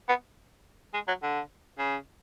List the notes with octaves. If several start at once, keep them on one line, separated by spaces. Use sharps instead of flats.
B3
G#3
F#3
D3
C#3